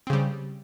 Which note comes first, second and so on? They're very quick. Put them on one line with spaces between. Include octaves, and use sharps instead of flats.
C4 C#3 G3